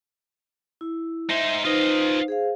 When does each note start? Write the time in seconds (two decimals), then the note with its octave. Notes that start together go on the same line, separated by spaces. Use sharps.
0.81 E4
1.30 D#4 C5 E5
1.65 D#4 F4 B4 C5 D#5
2.28 G#4 C5 F5